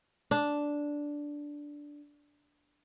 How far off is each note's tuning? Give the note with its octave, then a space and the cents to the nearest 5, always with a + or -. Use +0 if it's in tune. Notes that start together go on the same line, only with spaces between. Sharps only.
D4 -5